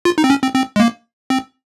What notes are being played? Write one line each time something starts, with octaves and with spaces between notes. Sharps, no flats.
F4
D#4
C4
C#4
C4
C4
G#3
A#3
C4